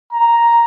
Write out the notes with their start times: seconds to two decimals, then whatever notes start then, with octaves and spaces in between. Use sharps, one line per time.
0.13 A#5